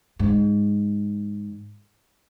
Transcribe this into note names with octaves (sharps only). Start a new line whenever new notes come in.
G#2 E3